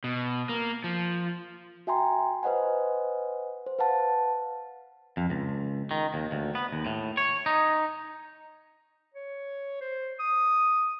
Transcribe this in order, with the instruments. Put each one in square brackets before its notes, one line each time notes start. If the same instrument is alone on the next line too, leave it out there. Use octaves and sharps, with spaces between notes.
[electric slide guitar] B2
A#3
F3
[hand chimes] F#4 E5 G5 G#5 A#5 C6
B4 C5 D#5 F#5 G#5
C5
B4 F5 F#5 A5
[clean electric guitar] F2
C#2
D#3
D#2
D2
B3
D#2
A2
C#5
D#4
[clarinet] C#5
C5
D#6